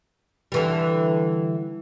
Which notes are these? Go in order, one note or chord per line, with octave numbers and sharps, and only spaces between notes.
D3 E3 G3